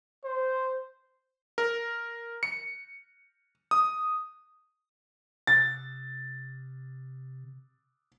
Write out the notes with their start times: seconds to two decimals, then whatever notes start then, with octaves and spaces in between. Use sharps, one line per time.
0.24 C5
1.58 A#4
2.43 C#7
3.71 D#6
5.47 C3 A6